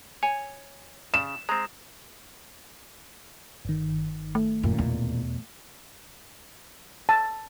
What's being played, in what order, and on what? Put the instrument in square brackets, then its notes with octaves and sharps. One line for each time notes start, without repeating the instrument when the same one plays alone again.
[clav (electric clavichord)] C#5 [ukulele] G#5
[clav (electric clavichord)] C#3 [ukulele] D5 [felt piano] E7
[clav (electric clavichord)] G#3 C4 [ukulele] A#5
[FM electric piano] G1 D#3
[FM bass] A3
[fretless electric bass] D#1 A#2 [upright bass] F#2
[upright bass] E2 B2
[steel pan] A5